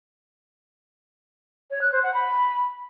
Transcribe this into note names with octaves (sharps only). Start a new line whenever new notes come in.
C#5
F#6
C5
F#5
B5